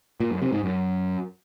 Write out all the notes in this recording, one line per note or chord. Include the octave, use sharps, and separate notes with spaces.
A#2
F#2
C3
G#2
F#2